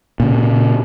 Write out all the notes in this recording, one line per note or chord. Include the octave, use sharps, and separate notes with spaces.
A#2 C#3